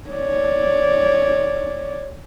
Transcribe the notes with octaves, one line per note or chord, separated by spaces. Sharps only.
C#5 D5